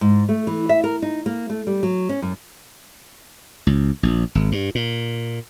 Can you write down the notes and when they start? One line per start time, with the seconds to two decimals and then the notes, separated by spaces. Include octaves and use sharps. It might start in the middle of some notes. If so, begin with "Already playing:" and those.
0.01 G#2
0.29 A3
0.47 E3
0.69 E5
0.84 A#4
1.02 D#4
1.26 A#3
1.50 A3
1.67 G3
1.83 F#3
2.09 C#4
2.22 F#2
3.67 C#2
4.03 A#1
4.35 G#1
4.52 G2
4.75 A#2